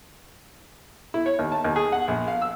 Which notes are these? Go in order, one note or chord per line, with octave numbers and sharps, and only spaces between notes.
E4
C#5
D#2
A5
D#2
G#4
F#5
A#1
F5
E6